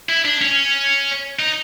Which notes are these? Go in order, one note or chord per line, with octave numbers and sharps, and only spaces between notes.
E4
D4
C#4
D#4